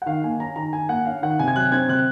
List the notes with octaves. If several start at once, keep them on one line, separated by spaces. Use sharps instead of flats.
F#5
D#3 F5
A#3 G#5
C#4 A#5
D#3 A#5
D#3 G#5
A#3 F#5
C#4 F5
D#3 F#5
C3 G#5
G#6
F#3 F#6
C4 G#6
C3 F#6